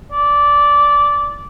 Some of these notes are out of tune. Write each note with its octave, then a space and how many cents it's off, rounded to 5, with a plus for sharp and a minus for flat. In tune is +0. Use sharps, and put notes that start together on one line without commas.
D5 -15